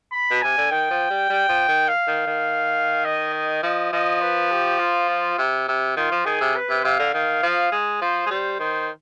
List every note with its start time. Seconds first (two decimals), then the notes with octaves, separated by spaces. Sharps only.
0.12 B5
0.31 B2
0.42 C3 G#5
0.58 D3
0.71 D#3 G5
0.90 F3
1.10 G3
1.30 G3
1.49 F3
1.68 D#3
1.88 F5
2.07 D#3
2.27 D#3
3.05 D#5
3.34 D#5
3.63 F3 D#5
3.93 F3 D#5
4.22 B4
4.51 G4
4.79 F4
5.09 F4
5.38 C3
5.68 C3
5.97 D#3 F4
6.12 F3
6.26 D#3 G#4
6.41 C3
6.56 B4
6.70 C3
6.84 C3 F5
6.99 D3
7.14 D#3 F5
7.43 F3
7.72 G#3
8.01 F3 C5
8.26 G#3
8.31 G3 C5
8.59 D#3 C5